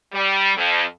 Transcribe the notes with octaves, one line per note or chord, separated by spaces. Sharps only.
G3
F2